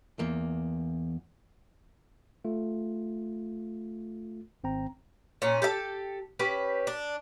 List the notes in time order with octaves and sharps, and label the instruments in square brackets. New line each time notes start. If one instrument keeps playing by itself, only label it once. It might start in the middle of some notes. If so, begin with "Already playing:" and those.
[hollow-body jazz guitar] E2 A#3
[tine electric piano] A3 F4
G#1 C4 G5 A#5
[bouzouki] A#2 C#4
G4 A4 D#5 A5
C#4 G4 B4
D4